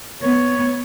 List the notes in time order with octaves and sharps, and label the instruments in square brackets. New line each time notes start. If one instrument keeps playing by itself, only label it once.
[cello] B3 [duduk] C#5